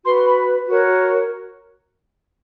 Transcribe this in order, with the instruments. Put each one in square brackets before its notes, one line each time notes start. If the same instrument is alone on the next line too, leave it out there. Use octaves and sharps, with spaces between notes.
[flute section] F#4 B4 C6
B5
F#4 A#4 C#5